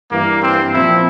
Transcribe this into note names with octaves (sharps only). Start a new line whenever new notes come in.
G2 E3 A#3
C4
A#2 F3 C4 E4